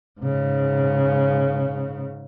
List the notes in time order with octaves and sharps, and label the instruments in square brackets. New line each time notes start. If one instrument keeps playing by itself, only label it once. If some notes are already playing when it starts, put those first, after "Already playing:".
[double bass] G#2 C#3